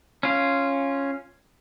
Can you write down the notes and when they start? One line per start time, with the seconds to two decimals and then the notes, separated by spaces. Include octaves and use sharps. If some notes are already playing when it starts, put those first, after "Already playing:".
0.23 C#4 F4